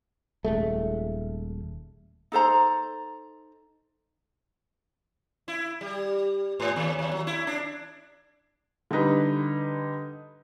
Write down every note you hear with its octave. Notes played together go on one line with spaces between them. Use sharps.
D#1 G#3 A3
D#4 A4 C5 A#5
E4
G3
G#2
D#2
D#2
F#3
E4
D4
D3 G3 D#4 B4